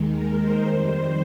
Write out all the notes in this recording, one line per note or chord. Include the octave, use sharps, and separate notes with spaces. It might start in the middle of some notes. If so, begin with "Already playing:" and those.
Already playing: D#2 D#3 G#3
A#4
C5
F2 D#3 G3 C5